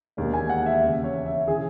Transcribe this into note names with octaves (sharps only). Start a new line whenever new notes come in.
E1 D#2 D#3
G#5
F#5
E5
E1 E2 C#3
C#5
E5
C#3 E3 G#4